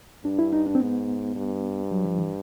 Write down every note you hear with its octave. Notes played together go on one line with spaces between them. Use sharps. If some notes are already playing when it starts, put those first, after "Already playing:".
G2 D4
E4
D#4
D4
C4
G#2 B3
G2
F#3
F3
E3